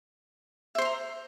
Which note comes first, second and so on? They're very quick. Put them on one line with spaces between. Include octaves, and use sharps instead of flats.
E5 C5 C6 A#5